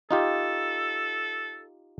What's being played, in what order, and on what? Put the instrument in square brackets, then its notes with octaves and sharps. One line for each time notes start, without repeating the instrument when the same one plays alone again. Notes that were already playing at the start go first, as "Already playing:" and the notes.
[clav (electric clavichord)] D#4 F4 G4 [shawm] A4